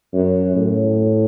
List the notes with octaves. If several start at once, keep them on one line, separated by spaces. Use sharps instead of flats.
F#2
A2